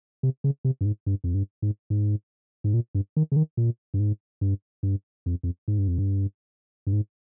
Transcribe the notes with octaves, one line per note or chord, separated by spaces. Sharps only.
C3
C#3
C3
G2
G#2
G2
F2
G2
G#2
G#2
G#2
A#2
G2
D#3
C#3
D#3
A#2
G2
G#2
G2
G2
F2
F2
G#2
G2
F2
G2
G2
G#2